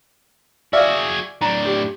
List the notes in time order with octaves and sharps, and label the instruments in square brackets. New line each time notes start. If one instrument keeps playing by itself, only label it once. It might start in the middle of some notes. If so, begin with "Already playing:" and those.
[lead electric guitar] F#4 G#4 [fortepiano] D5 E5 F5
[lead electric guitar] A2 D4 [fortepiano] A#5
[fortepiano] G4